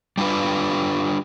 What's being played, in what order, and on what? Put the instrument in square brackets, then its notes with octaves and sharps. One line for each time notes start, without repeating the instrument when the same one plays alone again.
[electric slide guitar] G3 D4 F4 B4